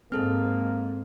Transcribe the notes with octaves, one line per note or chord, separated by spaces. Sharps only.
G#2 A#3 C4 G#4 A4 F6